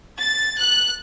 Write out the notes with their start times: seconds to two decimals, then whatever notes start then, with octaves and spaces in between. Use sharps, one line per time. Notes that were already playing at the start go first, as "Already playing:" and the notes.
0.19 A6
0.58 F#6